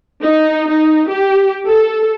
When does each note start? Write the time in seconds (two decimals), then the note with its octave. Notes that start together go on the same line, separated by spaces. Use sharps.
0.23 D#4
0.69 D#4
1.09 G4
1.68 A4